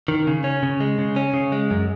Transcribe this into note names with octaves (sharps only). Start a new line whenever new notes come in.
D#3
C#3
C#4
C#3
G#3
C#3
C#4
C#3
G#3
F#2